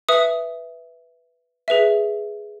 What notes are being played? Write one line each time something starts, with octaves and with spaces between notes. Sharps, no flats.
B4 E5 D#6
G#4 B4 E5